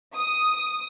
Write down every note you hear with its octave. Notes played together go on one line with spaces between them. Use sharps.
D#6